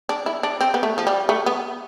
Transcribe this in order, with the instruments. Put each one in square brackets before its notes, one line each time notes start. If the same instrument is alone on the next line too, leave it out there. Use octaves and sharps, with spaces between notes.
[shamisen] D4
E4
D4
C4
B3
A3
F3
G3
A3
B3